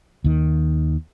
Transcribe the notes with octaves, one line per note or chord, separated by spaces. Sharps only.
D#2 D#3